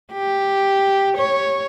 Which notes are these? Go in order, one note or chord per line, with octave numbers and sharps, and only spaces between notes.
G4
C#5